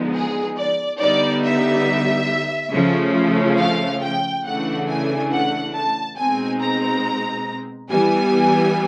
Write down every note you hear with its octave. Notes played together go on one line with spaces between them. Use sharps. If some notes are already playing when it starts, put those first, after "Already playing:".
Already playing: D3 F3 G#3 B3 D#4
G#4
D5
D3 G3 B3 D#4 D5
E5
C#3 F3 A3 C#4
F5
G5
C#3 E3 A3 D4 F#5
G#5
F#5
A5
B2 G#3 C4 D#4 G#5
A#5
E3 G3 B3 G#5